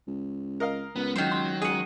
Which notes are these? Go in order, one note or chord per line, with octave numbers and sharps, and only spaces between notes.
C#2
A#4 D#5 F5
C#2 B3
D#3 F#3 C5
C#2 C6
C#2 G#4 D#5 F#5